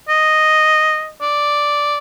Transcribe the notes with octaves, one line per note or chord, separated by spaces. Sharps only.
D#5
D5